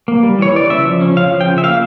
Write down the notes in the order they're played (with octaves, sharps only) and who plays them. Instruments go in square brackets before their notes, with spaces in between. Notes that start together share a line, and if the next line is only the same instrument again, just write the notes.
[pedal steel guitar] A#3
G3
E3 C#5
E3 D5
C#3 E5
F3
C#4
C#3 F5
F3
G5
C#3
E5
A#3 F5